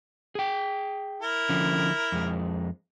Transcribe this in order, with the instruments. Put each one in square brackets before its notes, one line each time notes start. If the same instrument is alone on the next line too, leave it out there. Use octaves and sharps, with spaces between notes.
[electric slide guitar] G#4 G5
[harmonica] E4 A#4
[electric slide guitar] D3 F3 C#4
F2 G#3